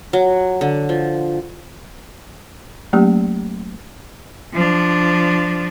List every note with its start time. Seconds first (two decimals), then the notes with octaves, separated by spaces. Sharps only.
0.13 F#3
0.61 D3
0.89 F3
2.93 F#3 A3 A#3 C#4 G4
4.53 F3 D4